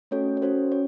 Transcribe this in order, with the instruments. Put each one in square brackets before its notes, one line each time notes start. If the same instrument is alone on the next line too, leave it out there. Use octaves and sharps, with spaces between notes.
[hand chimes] A3 C#4 F#4 A4 C#5
C#5
C#4 F#4 A4 C5
C#4 C#5